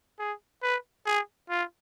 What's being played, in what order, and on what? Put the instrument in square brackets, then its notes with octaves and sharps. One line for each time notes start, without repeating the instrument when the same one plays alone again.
[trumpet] G#4
B4
G#4
F4